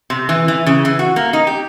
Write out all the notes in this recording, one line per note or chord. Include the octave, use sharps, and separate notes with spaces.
C3
E3
E3
C#3
E3
F#4
A#3
D#4
G4